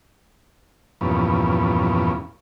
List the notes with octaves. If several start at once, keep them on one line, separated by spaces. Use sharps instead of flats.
E2 G2 A#2 F3 B3 C#4